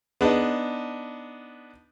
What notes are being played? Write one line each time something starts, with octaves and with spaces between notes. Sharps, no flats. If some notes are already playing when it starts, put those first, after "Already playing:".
B3 D4 D#4